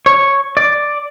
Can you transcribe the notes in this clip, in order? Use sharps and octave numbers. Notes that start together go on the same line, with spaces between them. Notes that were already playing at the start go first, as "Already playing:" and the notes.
C#5
D5